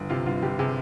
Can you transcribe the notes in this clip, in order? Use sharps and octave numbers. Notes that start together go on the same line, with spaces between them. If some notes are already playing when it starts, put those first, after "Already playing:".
Already playing: G1
C3 F4
G1 F4
G1 G4
C3 G#4